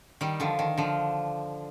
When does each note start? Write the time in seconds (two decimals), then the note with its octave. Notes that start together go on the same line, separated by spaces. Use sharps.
0.21 D#3 G3
0.40 D3 F3
0.59 D#3
0.77 D3 F3